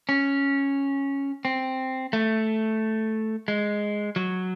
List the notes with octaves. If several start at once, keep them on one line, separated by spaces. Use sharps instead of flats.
C#4
C4
A3
G#3
F#3